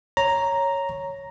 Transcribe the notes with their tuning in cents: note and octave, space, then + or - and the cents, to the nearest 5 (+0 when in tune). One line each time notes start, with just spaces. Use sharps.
C#5 +0 A#5 +0